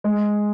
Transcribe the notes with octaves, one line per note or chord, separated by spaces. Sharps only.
G#3